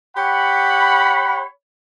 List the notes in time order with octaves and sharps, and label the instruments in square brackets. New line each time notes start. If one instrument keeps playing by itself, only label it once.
[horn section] G4 C#5 F#5 B5